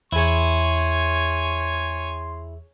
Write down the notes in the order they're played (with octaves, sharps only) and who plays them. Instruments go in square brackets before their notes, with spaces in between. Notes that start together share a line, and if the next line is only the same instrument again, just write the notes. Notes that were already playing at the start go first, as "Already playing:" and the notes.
[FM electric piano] E2 G#4 [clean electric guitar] E4 [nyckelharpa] C#5 G#5 [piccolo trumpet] C6